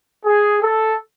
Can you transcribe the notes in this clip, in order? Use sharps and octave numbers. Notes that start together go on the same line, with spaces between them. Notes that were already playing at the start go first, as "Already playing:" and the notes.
G#4
A4